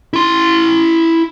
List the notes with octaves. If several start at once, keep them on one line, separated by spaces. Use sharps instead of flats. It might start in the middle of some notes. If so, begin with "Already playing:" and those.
E4 C6